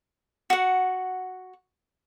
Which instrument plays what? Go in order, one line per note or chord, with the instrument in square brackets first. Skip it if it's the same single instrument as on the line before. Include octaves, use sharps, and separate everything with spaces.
[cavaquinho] F#4 F#5